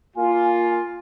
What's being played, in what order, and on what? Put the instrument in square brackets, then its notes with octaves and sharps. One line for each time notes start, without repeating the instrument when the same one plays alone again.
[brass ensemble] A#3 F4 [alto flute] G#5